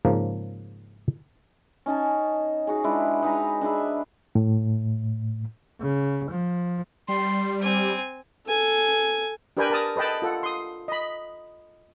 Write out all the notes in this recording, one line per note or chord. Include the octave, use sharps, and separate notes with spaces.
G#2 C#3 F3 A#3
C#4 D#4 G#5 A5
D#4 F#4 G#4
G#3 D4 E4 B4
D#4 B4 G#5 A#5
D4 G#4 B4 E5
A2
C#3
F3
G3 C6
C4 G#5
A4 G#5
D4 G4 A#4 B4 G5 G#5
A#4 A5 D#6
A4 B4 D#5 G5 A5
F4 A4 F#5
C6 D#6
D#5 B5